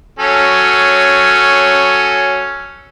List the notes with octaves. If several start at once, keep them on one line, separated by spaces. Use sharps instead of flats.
F#3 C#4 A4